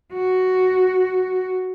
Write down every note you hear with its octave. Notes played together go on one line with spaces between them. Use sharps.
F#4